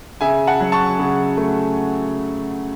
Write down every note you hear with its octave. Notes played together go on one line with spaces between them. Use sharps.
C#3 E5 G#5
F#5 A5
F#3
A5 C#6
C#3
A3